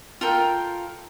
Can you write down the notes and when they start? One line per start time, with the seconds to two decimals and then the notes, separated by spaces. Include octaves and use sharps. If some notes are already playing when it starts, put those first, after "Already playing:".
0.21 F4 A4 A#4 G5